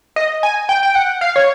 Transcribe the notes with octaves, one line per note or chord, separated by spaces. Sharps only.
D#5
G#5
G5
G5
F#5
F5
C#5